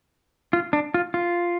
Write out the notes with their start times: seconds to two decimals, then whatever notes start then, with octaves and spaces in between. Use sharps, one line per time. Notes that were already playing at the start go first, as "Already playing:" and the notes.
0.53 F4
0.73 D4
0.94 F4
1.14 F4